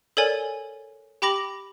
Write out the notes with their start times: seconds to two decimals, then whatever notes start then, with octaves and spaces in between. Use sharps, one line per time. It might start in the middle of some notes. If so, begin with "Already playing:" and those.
0.17 A4 A#4 C#5 D5 G#5
1.22 G4 G5 B5 D6 A#6 F#7